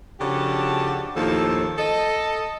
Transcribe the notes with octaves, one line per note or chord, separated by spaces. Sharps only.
C#3 F3 D4 F#4 G4 A4
D#2 A2 F3 A4
A4 D#5